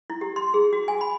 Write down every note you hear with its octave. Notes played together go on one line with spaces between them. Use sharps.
E4
G4
C6
G#4
F#4
G#5
B5